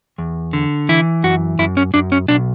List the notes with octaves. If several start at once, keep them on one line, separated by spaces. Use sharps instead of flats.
E2
D3
E3 E4
F#2 F#4
F#2 E4
C#4
F#2 D4
C#4
B1 D4